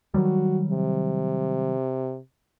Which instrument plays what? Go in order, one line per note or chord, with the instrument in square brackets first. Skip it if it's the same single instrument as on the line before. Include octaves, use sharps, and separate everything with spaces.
[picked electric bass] D#3 F#3 G3 [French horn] F#4
[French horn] C3